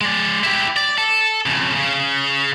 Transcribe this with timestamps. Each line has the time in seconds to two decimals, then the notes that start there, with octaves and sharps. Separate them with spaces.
0.01 G#3 D5
0.44 E4 G4
0.77 D5
0.98 A4
1.46 F2 C#3
1.76 C#3